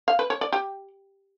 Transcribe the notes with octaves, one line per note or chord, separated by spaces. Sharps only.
F5
B4
C#5
D5
G4